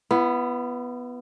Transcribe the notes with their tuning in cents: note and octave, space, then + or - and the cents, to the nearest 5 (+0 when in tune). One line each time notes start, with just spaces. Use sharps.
B3 +0 E4 +40